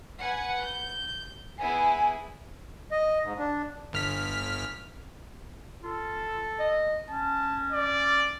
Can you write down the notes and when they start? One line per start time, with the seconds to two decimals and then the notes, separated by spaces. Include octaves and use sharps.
0.20 B4 F#5 G#5
0.59 G6
1.59 B3 E4 G#4 G#5
2.91 D#5
3.23 G#2
3.38 D4
3.93 G1 F6 B6
5.83 F4 A4
6.59 D#5
7.10 C#4 A5
7.72 D5